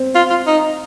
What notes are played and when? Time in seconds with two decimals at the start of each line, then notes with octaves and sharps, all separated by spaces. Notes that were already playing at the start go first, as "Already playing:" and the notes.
Already playing: C4
0.15 F4
0.30 F4
0.47 D#4